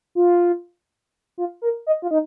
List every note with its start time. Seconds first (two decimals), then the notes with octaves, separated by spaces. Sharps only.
0.15 F4
1.38 F4
1.62 A#4
1.87 D#5
2.02 F4
2.11 D#4